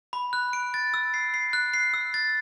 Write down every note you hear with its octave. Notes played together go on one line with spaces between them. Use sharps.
B5
F#6
D7
A6
E6
C7
C7
F#6
C7
E6
A6